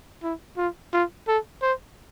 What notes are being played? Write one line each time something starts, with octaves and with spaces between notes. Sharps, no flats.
E4
F4
F4
A4
C5